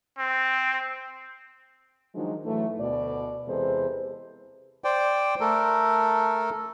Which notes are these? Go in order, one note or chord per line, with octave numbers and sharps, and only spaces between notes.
C4
D#3 F3 F#3 G#3 D4 D#4
A2 E3 F#3 A3
D2 B2 D5
E2 C3 G#3 A4 B4 C5
C5 D5 G5
A3 A4 A#4